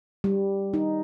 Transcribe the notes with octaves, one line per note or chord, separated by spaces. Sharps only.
G3
D#4